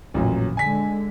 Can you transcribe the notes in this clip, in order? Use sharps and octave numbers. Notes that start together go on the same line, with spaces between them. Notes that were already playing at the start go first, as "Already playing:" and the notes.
A1 F2 A#2 F#3
D3 G#3 G#5 B6